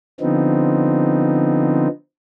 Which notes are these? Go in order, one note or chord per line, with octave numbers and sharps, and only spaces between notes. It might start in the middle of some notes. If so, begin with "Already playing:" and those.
D3 F3 B3 C4 D#4